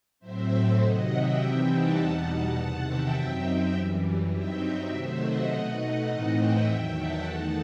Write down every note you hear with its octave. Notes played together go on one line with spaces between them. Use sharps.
A2 F#3 C4 C5 E5
A4 C5
C3 D#3 F#3 D#5 F#5
E5 G5
C3 E3 G3 C4 D#4
F#5 A5
E2 B2 G3 D#4
F#5 A5
E2 C3 D#3
E5 G5
F#2 F#3 C4 D#4
F#2 E3 G3
G2 F#3 C4 D#4 E5 G5
E5 G5
C3 D#3 F#3 A3 C5 E5
D#5 F#5
B2 A3 D#4
D#5 F#5
A2 E3 A3 C4 D#4
E5 G5
E2 D#3 F#3
F#5 A5
E2 D#3 A3 D#4 F#5 A5